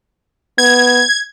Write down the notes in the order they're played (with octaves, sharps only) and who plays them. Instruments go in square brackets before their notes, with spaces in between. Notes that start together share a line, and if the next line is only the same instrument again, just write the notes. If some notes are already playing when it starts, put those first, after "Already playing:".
[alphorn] B3 [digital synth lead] G#6